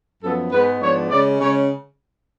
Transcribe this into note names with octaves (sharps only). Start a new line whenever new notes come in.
F#2 F3 B3 A4
G#2 G#3 B3 B4
G#2 F3 B3 D4 C#5
C#3 G#3 C#4 D5
C#3 G#3 C#4 C#5